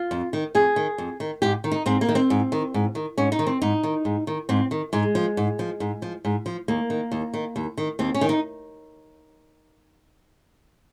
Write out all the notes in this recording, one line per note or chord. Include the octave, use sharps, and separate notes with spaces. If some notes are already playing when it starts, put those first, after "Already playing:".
Already playing: F4
F2
D#3
F2 G#4
D#3
F2
D#3
G#2 G4
D#3
D#4
G#2 C4
A#3
D#3
C4
G#2
D#3
G#2
D#3
G#2 C#4
D#4
D#3
C4
G#2 D#4
D#3
G#2
D#3
G#2 C4
D#3
G#2 G#3
F3
G#2
F3
G#2
F3
G#2
F3
D#2 A#3
D#3
D#2
D#3
D#2
D#3
D#2 C4
C#4
D#3
D#4